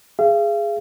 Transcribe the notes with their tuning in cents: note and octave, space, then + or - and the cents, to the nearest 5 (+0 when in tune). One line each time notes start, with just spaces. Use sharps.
G#4 +0 F5 -40